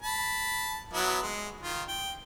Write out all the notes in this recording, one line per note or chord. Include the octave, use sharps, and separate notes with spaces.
A5 B5
F#3 B3 E4
G#3
D#3 F4
G5